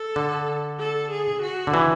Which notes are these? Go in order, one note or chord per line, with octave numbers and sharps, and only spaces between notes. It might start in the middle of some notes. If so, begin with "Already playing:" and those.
Already playing: A4
D3
A4
G#4
F#4
D3
E3